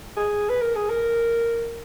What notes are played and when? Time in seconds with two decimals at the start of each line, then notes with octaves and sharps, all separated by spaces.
0.17 G#4
0.49 B4
0.62 A#4
0.76 G#4
0.90 A#4